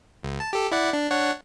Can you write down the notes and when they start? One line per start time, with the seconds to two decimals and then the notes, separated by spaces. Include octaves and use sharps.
0.23 C#2
0.40 A5
0.53 G4 A4
0.72 E4 D5 F#5
0.93 D4
1.11 D4 C#5 F#5